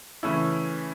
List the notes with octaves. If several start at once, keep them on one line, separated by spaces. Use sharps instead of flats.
C#3 E3 A3 C#4 E4